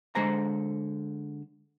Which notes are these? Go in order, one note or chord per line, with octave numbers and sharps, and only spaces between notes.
D3 G#3 C5 A#5